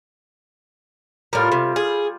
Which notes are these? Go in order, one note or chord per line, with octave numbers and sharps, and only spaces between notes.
A2 G3 F4 A#4
C3
G#4